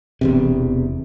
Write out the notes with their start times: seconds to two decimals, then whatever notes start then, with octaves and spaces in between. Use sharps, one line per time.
0.21 E1 E2 C3